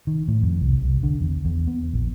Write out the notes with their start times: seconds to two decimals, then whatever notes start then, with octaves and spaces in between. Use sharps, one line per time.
0.07 D#3
0.28 A2
0.43 F2
0.61 C2
0.82 C2
1.03 D3
1.21 E2
1.45 E2
1.67 B3
1.94 A#1